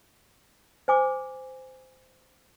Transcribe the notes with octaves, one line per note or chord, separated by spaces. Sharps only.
C5 G#5 D6